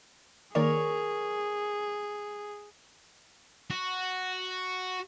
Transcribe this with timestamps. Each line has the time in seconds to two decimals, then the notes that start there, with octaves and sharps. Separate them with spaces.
0.55 D#3 A#3 G#4 A#4 C#5 D5
3.70 F#4